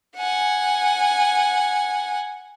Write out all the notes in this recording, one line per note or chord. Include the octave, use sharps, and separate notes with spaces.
F#5 G#5